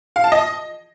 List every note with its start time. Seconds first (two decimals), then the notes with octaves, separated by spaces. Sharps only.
0.16 F5
0.24 A5
0.32 D#5